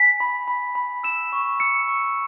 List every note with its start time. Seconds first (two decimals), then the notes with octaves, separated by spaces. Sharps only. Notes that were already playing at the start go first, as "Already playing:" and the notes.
Already playing: G#5 B6
0.20 B5
0.48 B5
0.75 B5
1.04 E6 E7
1.33 C#6
1.60 E6 C#7
1.88 C#6